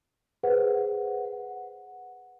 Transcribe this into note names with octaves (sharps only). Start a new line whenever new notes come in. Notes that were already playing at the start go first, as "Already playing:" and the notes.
G#4 B4 C5 F#5
F#5